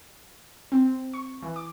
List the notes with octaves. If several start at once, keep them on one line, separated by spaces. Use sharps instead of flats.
C4
C#6
E3
D6